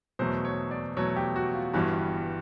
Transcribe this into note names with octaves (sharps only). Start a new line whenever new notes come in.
E2 B2 F#3 A3 C5
C#5
D5
E2 B2 F#3 A3 C#5
G4
F#4
F4
G1 G2 E3 G3 F#4